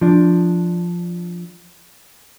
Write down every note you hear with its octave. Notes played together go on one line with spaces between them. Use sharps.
F3 D4